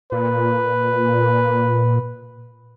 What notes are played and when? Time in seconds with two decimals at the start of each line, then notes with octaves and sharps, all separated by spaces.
0.12 A#2 B4